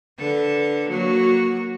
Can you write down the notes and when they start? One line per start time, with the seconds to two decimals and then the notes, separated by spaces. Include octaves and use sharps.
0.18 D3 A4 B4
0.89 F#3 A#3 F#4